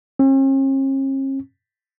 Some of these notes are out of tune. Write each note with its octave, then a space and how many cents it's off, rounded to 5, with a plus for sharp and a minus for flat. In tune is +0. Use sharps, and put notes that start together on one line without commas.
C#4 -45